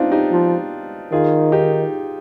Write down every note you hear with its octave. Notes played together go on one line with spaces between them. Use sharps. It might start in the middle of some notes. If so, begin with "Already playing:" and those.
Already playing: B3 C4 D4 D#4 F4
D#4 G4
F3
D#3 F4 G#4
D#4 G4